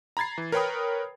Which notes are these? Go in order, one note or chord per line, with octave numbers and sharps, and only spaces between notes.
A#5 B5 G#6 A6 C7
E3
A#4 B4 C#5 G5 B5 D#6